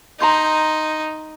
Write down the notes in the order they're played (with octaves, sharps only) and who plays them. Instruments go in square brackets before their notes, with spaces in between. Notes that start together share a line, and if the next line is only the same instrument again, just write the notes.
[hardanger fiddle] D#4 [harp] A#5 C6 G6